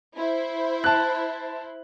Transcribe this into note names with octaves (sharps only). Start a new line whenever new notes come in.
E4 C5
A5 F#6